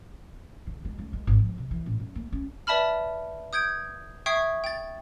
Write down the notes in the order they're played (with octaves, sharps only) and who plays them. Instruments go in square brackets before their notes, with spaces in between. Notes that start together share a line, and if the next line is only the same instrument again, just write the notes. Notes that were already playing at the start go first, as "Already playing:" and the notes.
[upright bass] D3
G#3
C#2
G#3
G#1
F3
C3
E3
A1
F#2
A#3
C#4
[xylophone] B4 D5 E5 A5 B5 F6
D#6 G6 G#6 D7
E5 G5 C#6 D#6 G#6 C7
G5 A6